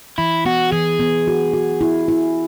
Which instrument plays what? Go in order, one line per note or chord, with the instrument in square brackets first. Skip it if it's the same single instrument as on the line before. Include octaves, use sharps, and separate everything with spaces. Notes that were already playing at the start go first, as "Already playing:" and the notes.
[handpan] E3 [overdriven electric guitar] E4
[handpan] B3 [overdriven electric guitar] F#4
[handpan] E3 [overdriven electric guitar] G#4
[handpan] B3
F#4
F#4
E4
E4